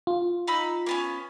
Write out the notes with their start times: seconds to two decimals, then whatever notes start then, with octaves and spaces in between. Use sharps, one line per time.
0.07 F4
0.47 D#4 B5 E6
0.86 A#3 B3 C#4